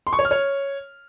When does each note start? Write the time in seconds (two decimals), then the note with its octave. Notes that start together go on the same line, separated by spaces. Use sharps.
0.07 C6
0.13 C#6
0.19 C#5
0.25 F6
0.31 C#5